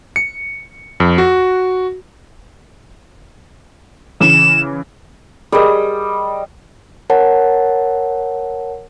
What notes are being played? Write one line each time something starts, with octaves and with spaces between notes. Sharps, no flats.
C#7
F2
F#4
C#3 E3 E7
G3 G#4 A#4 D#5
A#4 C#5 F#5 A5